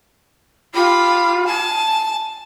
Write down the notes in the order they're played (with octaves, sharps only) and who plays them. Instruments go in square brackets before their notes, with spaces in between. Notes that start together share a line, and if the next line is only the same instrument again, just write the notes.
[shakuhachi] F4 [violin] G4 B5
[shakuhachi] G#5 [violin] A5